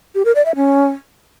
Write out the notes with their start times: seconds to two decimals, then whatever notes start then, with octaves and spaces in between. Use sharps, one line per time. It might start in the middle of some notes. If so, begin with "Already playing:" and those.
0.15 G4
0.25 A#4
0.35 D5
0.46 E5
0.56 C#4